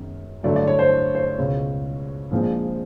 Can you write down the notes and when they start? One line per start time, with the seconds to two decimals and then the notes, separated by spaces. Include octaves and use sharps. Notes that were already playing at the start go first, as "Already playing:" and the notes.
Already playing: F#2 D#3 G#3 B3
0.43 G2 D3 F#3 A3 D5
0.56 D5
0.67 C#5
0.79 C5
1.15 C5
1.37 C#2 B2 G#3 C#5
2.31 A#1 A#2 F3 G#3 C4